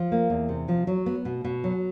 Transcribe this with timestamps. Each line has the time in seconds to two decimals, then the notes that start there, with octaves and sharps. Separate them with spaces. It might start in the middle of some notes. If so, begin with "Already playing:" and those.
Already playing: F3
0.12 A#3
0.30 E2
0.49 C3
0.68 F3
0.87 F#3
1.06 B3
1.25 B2
1.44 B2
1.64 F#3